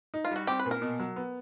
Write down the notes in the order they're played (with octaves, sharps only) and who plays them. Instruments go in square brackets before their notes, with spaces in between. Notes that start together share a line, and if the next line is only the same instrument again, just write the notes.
[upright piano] D#4
[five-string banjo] F4
[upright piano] G3 [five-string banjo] F#4
[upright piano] C4 [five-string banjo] G4
[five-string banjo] B4
[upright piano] A#2
[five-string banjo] A#4
[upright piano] B2
F#3
B3